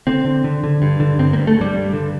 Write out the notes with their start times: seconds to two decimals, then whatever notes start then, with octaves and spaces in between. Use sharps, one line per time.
0.07 D3 C4
0.25 D3
0.44 D3
0.64 D3
0.82 G2
1.00 D3
1.18 G2 C4
1.33 A#3
1.37 G2
1.47 A3
1.57 G2 G3
1.75 G2
1.93 D3